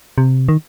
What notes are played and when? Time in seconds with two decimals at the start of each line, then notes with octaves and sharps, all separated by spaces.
0.18 C3
0.49 D#3